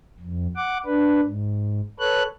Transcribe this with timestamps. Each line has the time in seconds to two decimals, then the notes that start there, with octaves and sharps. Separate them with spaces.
0.20 F2
0.56 F#5 D6
0.85 D4 B4
1.26 G#2
1.99 A4 B4 C#5 F#6